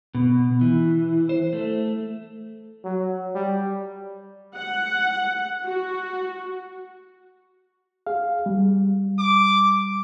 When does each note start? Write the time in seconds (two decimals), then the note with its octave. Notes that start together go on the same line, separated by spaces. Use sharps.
0.15 B2
0.61 E3
1.29 C5
1.53 A3
2.84 F#3
3.35 G3
4.56 F#5
5.66 F#4
8.07 G#4 F5
8.46 G3
9.19 D6